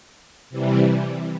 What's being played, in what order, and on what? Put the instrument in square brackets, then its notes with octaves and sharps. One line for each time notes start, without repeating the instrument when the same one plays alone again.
[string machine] C3 E3 G3